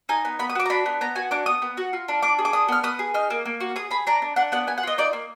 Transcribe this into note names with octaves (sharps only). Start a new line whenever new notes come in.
D#4 G#5
B3
B3 B5
D#6
F#4 D6
A#5
D4 B5
B3
B3 A#5
F#4 G#5
D4 D6
B3 D#6
B3
F#4
F4
D4
D4 D6
G#4
D6
D4 D#6
B3 F6
B3 D#6
G#4
D#4 F6
A#3
A#3
F#4
G#4 D#6
G#4 B5
D4 A#5
D4
D4 F#5
B3 F#5
B3 G#5
F#5
F4 D#5
D#4 D5
A#3